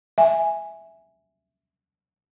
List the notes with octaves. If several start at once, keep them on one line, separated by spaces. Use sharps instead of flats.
E5 G#5